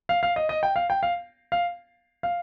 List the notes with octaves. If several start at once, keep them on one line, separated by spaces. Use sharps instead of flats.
F5
F5
D#5
D#5
G5
F5
G5
F5
F5
F5